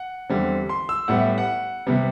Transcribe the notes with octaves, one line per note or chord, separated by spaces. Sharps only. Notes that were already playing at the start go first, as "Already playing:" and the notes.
Already playing: F#5
E2 D3 G3 C4
C6
E6
A2 G3 B3 F#5
E5
F#5
C3 G3 B3